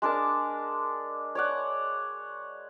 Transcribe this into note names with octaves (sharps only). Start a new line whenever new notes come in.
G#3 D4 A#4 A5
C#5 D5 F#5